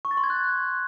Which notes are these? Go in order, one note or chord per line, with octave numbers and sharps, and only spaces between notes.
C#6
A6
C6
G#6
F#6